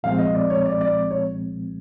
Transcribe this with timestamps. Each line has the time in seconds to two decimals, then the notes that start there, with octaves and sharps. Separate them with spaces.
0.03 C2 A#2 F3 G#3 C4 F5
0.19 D#5
0.35 D5
0.50 C#5
0.66 D5
0.81 D5
1.11 C#5